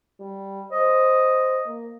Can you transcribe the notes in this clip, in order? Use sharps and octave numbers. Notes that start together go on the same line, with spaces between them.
G3
C5 D#5
A#3